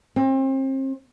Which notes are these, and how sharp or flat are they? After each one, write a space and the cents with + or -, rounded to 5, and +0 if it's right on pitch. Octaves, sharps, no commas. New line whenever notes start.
C4 +35